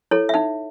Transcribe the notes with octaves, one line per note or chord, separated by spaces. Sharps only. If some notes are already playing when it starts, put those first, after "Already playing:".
E4 A4 C#5
E5
D#4 F#5